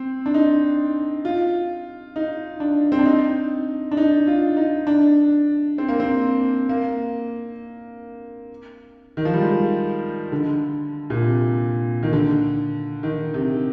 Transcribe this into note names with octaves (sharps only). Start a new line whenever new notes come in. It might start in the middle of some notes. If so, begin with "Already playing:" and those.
Already playing: C4
D4
D#4
F4
D#4
D4
C4
D4
D#4
D4
D#4
F4
D#4
D4
C4
A#3
C4
A#3
D#3
F3
G3
G#3
D3
A#2
C3
D#3
D3
D#3
C3